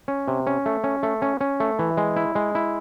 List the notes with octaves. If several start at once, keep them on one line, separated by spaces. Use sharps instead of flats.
C#4
C3
C#4
A3
C#4
A3
C#4
C#4
A3
E3
G#3
E4
G#3
E4